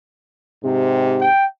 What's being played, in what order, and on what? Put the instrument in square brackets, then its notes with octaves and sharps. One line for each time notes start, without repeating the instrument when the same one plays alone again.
[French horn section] G#2 C3 G4
[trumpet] G5